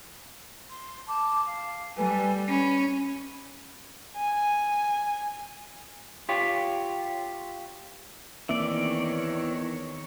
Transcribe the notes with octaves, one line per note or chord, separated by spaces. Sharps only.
C6
A5 D6
F5
G3 A4 B4 G#5
C#4 B5
G#5
F4 G4 C#5
E2 D#3 E3 A#3 C4 C#5 D5 E5